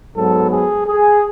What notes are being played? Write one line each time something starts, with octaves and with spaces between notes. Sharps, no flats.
G#2 F#3 B3 A4
G#4
G#4